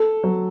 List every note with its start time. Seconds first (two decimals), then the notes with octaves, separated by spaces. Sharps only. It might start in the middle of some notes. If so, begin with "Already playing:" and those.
Already playing: A4
0.23 F#3